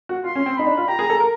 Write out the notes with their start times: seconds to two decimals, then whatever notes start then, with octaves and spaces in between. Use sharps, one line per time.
0.09 F#4
0.24 F4 C6
0.35 C#4
0.46 C4
0.57 D#4 B5
0.67 D4
0.77 F4
0.88 G4 A#5
0.99 G#4
1.10 A4
1.20 A#4